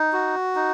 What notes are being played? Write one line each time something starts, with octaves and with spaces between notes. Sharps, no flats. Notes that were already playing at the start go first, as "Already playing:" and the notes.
Already playing: D#4
F#4
D#4